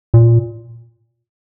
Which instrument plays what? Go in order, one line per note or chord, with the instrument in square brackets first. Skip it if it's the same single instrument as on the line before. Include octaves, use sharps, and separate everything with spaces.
[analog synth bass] A#2